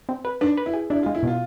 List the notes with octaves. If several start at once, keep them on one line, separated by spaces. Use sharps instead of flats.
C4
B4
D4 B4
B4
E4
G#4
D4 E4
F4
G#3
E4
B2 F4